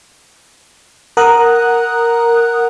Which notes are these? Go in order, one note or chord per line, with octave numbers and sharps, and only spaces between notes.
A#4 F#5 A#5 D#6 F#6